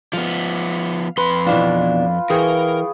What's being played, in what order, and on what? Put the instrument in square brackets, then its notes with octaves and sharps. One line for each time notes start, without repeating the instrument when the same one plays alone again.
[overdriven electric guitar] F3 B3 [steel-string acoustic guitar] F5
[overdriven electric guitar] F2 C6 [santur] B4
[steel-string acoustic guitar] B2 E3 D4 [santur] F4
[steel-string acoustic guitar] E3 G5 [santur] G#4 C#6 [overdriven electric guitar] A#4